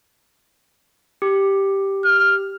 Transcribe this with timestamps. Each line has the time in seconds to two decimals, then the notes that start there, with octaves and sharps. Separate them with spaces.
1.22 G4
2.05 F6